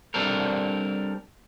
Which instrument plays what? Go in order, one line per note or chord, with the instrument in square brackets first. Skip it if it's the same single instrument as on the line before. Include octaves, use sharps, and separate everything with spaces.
[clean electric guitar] G3 C4 D4 A4 A#4